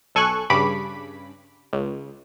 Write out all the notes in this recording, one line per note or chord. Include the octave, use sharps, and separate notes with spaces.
B1 A4 G#5 C#6 F#6
G2 C#3 B5 D6
C#2